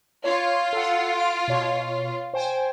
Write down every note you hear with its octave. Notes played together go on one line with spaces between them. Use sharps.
F4 C#5
A4 F#5
D7
B2 C#5
C5 G5 G#5